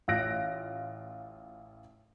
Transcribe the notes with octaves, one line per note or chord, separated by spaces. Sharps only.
A1 F4 E6 F#6 A#6 D7